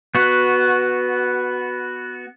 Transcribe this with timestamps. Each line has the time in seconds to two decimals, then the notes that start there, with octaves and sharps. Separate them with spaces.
0.15 B3 F#4